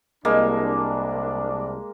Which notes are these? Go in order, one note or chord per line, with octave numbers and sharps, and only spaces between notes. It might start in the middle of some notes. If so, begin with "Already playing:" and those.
C2 G#3 A#3 D4